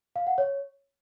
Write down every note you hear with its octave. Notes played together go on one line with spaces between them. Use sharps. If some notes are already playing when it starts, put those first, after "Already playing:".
F5
F#5
C#5